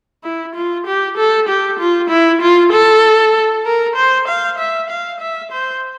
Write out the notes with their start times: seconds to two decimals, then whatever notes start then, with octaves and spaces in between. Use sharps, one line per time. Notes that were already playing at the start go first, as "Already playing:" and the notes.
0.24 E4
0.55 F4
0.86 G4
1.17 A4
1.48 G4
1.79 F4
2.10 E4
2.41 F4
2.73 A4
3.65 A#4
3.96 C5
4.28 F5
4.58 E5
4.90 F5
5.20 E5
5.52 C5